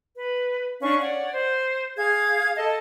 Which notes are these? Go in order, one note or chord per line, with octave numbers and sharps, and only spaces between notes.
B4
C#4 D4 F5 C#6
C#5 D5 F#5
C5
G#4 F5 G#6
A4 D#5 A5